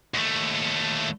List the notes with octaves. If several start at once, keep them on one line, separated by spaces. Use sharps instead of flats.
D#2 A3